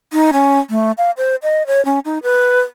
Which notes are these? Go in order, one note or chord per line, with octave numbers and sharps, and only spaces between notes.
D#4
C#4
A3
F5
C5
D#5
C#5
C#4
D#4
B4